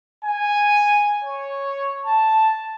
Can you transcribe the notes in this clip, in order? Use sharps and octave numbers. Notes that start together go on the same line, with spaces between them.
G#5
C#5
A5